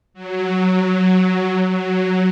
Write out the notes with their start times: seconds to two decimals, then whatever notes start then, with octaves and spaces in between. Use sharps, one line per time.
0.14 F#3
1.69 F#3